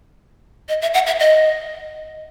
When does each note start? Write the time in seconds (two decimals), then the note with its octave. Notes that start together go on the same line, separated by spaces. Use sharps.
0.69 D#5
0.82 E5
0.94 F#5
1.06 E5
1.20 D#5